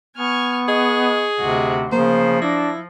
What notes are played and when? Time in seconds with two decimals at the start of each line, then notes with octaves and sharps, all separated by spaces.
0.18 B3 G#5 C#6 F6
0.68 G#4 D#5 C#6
1.40 D2 C3 F#4
1.92 C#3 F3 A#3 C5
2.42 D4 E4 A#6